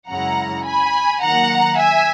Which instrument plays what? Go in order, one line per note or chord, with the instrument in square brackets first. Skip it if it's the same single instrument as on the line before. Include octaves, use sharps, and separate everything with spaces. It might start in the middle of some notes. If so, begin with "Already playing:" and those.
[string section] F#2 C#3 G#3 C#4 E4 F#5 A#5
G#5 B5
D#3 F#3 A#3 F#5 A#5
E5 G#5